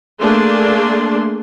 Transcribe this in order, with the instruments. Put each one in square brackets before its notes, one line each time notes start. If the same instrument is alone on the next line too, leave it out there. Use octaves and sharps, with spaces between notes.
[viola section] A3 A#3 D4 G#4 C6